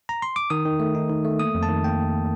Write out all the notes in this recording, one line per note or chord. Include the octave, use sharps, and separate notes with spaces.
A#5
C6
D6
D#3 D#6
D#3
A3
D#4
D#3
A3
A#3 D#6
F2
A5
D#3
A#3 G5